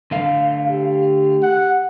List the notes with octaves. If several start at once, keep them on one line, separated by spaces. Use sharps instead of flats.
D3 A3 F5
G4
F#5